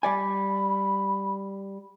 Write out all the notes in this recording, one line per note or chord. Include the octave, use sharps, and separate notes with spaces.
G3 D5 G#5 B5